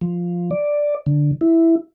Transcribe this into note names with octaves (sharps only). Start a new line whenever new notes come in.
F3
D5
D3
E4